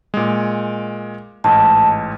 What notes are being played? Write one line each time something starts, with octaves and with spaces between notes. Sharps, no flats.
A#2 G#3
A1 G#2 A5